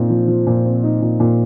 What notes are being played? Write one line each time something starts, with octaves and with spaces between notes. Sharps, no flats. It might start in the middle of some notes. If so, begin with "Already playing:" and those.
Already playing: A#2 C4 D#4
F3
F3
A#2
C4
D#4
A#2
A#2